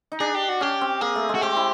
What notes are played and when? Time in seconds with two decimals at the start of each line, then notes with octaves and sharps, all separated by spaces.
0.12 D#4
0.20 D4 G#4
0.35 G4
0.49 F#4
0.61 C#4 G4
0.81 C4
1.01 A#3 G#4
1.15 A3
1.29 G#3
1.35 F#4
1.42 C4 G4
1.56 E4